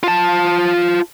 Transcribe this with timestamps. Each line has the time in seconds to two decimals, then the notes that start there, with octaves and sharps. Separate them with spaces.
0.03 F4 A5